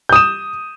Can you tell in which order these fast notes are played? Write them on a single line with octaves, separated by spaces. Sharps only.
G6 D#6 E7